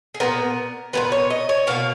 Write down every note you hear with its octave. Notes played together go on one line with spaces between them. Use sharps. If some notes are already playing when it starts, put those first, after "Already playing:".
G#4
A#2 G#3 B3 A#4
A#2 G#3 B3 B4
C#5
D#5
C#5
B2 A#3 F5